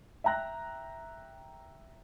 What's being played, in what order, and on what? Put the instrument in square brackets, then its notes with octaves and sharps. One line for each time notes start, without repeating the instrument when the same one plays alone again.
[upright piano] E5 G5 A#5 F#6 A#6